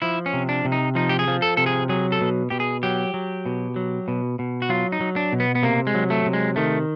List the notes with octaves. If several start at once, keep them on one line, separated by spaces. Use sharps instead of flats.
F3 E4
C#4
C3
D4
C3
D#4
F3 D#4
G4
G#4
F3
A4
C3 A4
G#4
F#3 G#4
A4
B2
B2 G4
G#4
F#3 G4
F#3
B2
F#3
B2
B2
F#4
F#3 F4
D#4
F#3
D4
B2
B3
B3
C3 A#3
G#3
F#3
A3
C3
G#3
D#3 A3